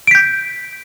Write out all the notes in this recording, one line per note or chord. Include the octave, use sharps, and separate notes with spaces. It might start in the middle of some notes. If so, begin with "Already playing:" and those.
G6 B6 D7